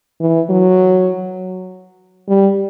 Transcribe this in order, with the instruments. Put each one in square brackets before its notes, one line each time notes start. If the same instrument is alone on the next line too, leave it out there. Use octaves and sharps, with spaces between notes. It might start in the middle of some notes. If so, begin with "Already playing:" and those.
[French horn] E3
F#3
G3